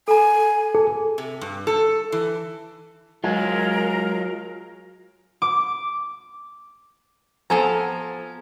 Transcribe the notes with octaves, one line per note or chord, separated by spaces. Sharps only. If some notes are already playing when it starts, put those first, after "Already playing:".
A4 G#5 A#5
G#4 A4
C3
G2
A4
E3
F#3 G#3 F4 A#4
D6
F3 B3 A4 G#5 A#5